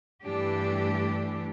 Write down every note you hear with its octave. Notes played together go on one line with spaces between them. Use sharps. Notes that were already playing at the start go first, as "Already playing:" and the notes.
G2 E3 A3 D4 G4